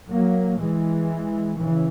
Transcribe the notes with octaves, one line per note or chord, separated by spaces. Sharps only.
F#3 A#3
E3 G#3
C#3 E3